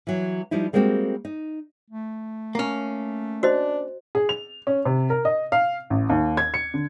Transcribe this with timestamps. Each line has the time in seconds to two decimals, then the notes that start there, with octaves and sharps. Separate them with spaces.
0.07 E3 F#3
0.51 F3 G3 D#4 E4
0.73 G3 G#3 A#3 C4 E4 F#4
1.25 D#4
1.90 A3
2.55 A#3 C#4
3.43 D4 F#4 C5 D#5
4.15 G#4
4.29 F7
4.67 C#4
4.85 C3
5.10 A#4
5.25 D#5
5.52 F5
5.90 A1
6.10 D#2
6.37 G#6
6.54 C#7
6.74 D3